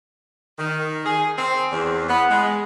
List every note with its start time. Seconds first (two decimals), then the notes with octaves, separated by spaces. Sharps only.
0.58 D#3
1.05 G#4
1.38 C4
1.72 E2
2.09 B3
2.30 G#3